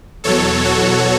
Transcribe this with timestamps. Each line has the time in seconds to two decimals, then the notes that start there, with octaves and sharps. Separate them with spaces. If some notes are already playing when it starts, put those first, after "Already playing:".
0.24 E2 B2 F#3 A4 C#5
0.65 F#4 A4